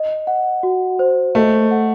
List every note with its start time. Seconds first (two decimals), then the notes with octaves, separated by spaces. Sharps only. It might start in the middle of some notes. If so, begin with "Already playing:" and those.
Already playing: D#5
0.27 F#5
0.63 F#4
0.99 C5
1.35 A3 D#5
1.71 F#5